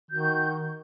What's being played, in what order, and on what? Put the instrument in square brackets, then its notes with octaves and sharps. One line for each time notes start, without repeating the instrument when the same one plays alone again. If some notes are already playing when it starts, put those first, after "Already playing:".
[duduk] D#3 [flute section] F#4 G6